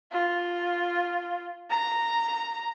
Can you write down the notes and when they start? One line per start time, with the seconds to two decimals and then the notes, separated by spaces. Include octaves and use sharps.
0.12 F4
1.70 A#5